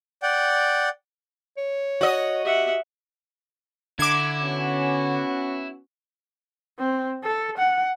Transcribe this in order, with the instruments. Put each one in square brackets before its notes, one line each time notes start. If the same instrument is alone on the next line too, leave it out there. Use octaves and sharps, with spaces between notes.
[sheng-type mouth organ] D5 F#5 G5
[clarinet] C#5
[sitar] F#4 D#5
[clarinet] G4 [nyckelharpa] E5 F#5
[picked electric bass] D3 [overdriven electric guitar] E4 [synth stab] D6 G#6
[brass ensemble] B3 C#4 F#4
[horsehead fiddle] C4
A4
F#5